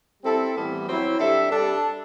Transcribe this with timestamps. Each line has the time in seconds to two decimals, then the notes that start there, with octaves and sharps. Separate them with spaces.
0.23 G3 C4 E4 A4
0.55 A2 E3 G3 B3
0.87 F#3 C4 E4
1.18 C3 G3 D4 A4 E5
1.50 G3 D4 A4